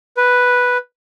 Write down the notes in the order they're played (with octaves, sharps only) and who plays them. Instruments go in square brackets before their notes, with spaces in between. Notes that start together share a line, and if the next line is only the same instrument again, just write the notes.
[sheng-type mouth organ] B4